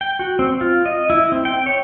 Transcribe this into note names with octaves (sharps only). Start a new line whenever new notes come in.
G5
F#4
C4
F4
D#5
E4
C4
G5
C#5